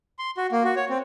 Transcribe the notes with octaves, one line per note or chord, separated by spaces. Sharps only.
C6
F#4
A#3
F#4
C#5
C4